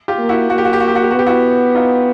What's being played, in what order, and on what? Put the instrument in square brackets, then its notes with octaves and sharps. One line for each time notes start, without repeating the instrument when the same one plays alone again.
[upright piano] F4 G4
[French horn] A#3
[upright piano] E4 F#4
[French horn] A#3 [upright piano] F#4
[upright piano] G4
F#4
G4
F#4
G4
F#4
G4
[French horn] B3 [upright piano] F#4
[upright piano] G4
E4 F#4
D#4 F4